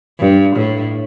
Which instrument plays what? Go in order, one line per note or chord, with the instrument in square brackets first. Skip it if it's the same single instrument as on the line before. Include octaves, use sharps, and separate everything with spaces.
[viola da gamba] G2
A2